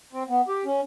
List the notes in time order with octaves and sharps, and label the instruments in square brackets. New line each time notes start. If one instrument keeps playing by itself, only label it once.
[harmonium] C4
B3
G4
C#4